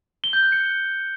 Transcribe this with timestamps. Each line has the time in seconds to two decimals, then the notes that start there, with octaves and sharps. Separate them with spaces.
0.24 G7
0.33 G6
0.43 F#6
0.52 C#7